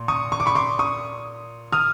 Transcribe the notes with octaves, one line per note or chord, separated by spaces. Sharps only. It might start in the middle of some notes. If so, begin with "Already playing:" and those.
Already playing: A#2
C#6 D#6
C#6
D6
B5 C#6
C6 D6
C#6 D#6
D#6 F6